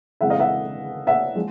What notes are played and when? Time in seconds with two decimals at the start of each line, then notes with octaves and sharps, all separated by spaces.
0.21 F2 C#3 E3 G#3 E5 F#5
0.30 D#5 F5
0.39 E5 F#5
1.07 E5 F#5
1.36 F3 G#3